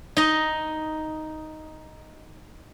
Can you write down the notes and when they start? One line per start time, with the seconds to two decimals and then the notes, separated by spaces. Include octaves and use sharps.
0.17 D#4 D#5